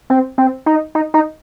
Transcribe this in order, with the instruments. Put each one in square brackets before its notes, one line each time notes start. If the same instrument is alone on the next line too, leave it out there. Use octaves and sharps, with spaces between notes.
[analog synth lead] C4
C4
D#4
D#4
D#4